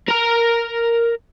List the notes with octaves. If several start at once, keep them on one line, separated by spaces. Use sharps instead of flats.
A#4 A#5